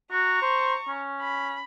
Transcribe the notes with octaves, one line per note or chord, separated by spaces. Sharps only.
F#4 A#5 C#6
C5
C#4
B5